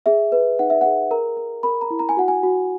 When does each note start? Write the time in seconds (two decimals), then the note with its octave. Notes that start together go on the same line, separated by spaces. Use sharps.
0.06 G#4 E5
0.32 B4
0.59 D#4 F#5
0.70 E5
0.81 G#4 F#5
1.11 A#4 A#5
1.37 A#4
1.63 A#4 B5
1.81 A#5
1.90 E4
1.99 A#5
2.09 G#5
2.17 F#4 F#5
2.28 G#5
2.43 F#4